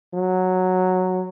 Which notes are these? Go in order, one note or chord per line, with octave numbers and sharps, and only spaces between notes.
F#3